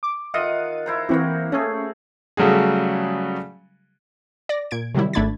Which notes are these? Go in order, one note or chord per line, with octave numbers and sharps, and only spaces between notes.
D6
D#3 F4 D#5 E5 F#5 D#7
E4 C5 A#5
E3 A#3 C4 E4 F#4 G4
A3 C#4 G#4
C#3 F#3 G3 A3 F#4 G#4
D5 A#6
A#2 G#6 D7
C3 D#3 F#3 G3 E4
G#1 A3 D4 B5 G#6 A6